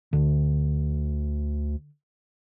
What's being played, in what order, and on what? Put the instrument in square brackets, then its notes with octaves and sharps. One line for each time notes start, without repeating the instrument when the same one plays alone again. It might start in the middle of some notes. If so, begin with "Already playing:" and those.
[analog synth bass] D2 [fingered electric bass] D3